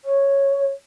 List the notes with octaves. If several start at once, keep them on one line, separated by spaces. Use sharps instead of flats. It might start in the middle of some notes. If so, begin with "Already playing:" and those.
C#5